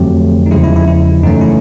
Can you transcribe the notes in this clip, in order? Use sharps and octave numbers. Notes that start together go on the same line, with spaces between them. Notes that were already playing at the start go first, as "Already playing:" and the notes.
Already playing: F2 D3 F#3 A3 C4 G4
D#4
E2 C#3 F3 G#3 E4
E4
E4
E4
F#2 C#3 E3 A3 C#4 D#4
E4